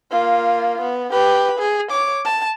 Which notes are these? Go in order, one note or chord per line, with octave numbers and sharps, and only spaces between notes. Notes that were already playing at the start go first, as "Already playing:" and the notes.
A#3 F4
B3
G4 B4
G#4
C#5 D6
A5